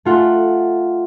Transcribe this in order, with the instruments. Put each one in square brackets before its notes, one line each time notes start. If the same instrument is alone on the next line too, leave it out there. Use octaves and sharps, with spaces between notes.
[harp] A3 F4 F#5